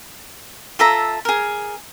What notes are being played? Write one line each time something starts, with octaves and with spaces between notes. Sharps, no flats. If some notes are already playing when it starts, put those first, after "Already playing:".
F4 A4 E5 A#5
G#4 A#4